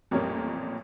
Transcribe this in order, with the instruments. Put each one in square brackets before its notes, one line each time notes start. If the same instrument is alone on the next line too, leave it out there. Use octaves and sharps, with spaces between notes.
[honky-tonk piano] A1 F2 A#2 G3 A#4 C#5